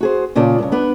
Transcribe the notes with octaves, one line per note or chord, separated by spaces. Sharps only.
F#4 G#4 C5
A#2 C#3 F4 D5 A5
G2 A#2 C#3
B3 D4 B4